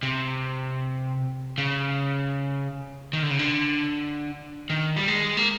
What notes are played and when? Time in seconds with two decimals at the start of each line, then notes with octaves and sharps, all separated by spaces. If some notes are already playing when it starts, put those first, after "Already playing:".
0.03 C3
1.58 C#3
3.13 D#3
3.23 D3
3.30 C#3
3.39 D3
4.70 D#3
4.96 G3
5.08 G#3
5.37 A#3